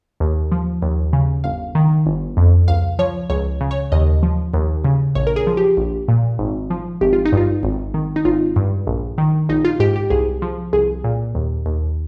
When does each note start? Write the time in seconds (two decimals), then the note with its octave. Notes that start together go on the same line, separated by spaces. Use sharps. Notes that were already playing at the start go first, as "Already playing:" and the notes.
0.20 D#2
0.52 F3
0.82 D#2
1.13 C#3
1.44 G1 F5
1.75 D#3
2.06 G1
2.37 F2
2.68 C#2 F5
2.99 F3 C#5
3.30 C#2 C#5
3.61 C#3
3.71 C#5
3.92 D#2 D#5
4.23 F3
4.54 D#2
4.85 C#3
5.15 A#1 C#5
5.27 A#4
5.36 G#4
5.47 F3
5.57 G4
5.77 A#1
6.08 A#2
6.39 G#1
6.70 F3
7.01 G#1 G4
7.13 F4
7.25 D#4
7.32 G2 F4
7.63 G#1
7.94 D#3
8.16 D#4
8.25 G#1 F4
8.56 G2
8.87 A#1
9.18 D#3
9.49 A#1 D#4
9.65 F4
9.80 G#2 G4
9.96 G4
10.10 C2 G#4
10.42 F3
10.73 C2 G#4
11.04 A#2
11.35 D#2
11.66 D#2